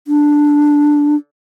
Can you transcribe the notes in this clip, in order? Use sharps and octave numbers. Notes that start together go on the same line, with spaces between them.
D4